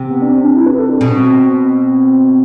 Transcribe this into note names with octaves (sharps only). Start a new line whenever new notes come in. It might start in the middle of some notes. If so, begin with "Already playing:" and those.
Already playing: C3
B3
D4
C4
D4
E4
B4
A4
D4
B2 C4
C4